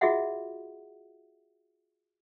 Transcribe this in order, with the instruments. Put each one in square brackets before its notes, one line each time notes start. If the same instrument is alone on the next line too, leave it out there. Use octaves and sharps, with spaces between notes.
[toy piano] F4 F#4 G#4 D#5 E5 F#5